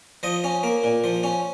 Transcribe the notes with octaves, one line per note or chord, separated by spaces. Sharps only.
F3 D#5
C#4
A#3
A#2
F3
C#4